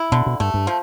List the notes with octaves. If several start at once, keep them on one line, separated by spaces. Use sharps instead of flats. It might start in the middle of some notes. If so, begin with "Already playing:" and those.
Already playing: E4
B2 D3
B2
G2 A3
G2
F3